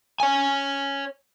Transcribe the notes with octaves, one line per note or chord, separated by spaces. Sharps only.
C#5 G#5